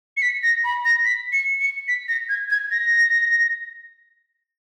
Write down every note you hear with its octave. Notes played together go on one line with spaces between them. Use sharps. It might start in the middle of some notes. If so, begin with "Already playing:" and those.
C#7
B6
A#6
B5
A#6
B6
C#7
C#7
B6
A#6
G#6
G#6
A#6